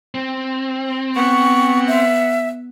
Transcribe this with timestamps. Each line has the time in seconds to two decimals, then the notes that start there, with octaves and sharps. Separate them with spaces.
0.15 C4
1.16 B3 F#5 C#6
1.87 E5